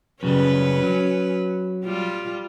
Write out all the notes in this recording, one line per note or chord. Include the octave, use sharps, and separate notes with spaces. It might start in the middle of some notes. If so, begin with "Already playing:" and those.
F#2 C#3 G3 C#4 B4
F#3
G3 F4